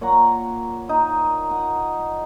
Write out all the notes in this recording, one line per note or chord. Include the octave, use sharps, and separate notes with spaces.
A#2 C#5 F#5 A#5
D#4
F#5